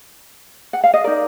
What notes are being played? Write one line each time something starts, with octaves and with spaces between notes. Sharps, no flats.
F#5
F5
D#5
D#4 A#4 D5